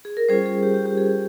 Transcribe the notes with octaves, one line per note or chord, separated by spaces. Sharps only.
G#4
A#4
G3 C#4 F4 G#4 C5
G#4
G4
G4
G4
G#4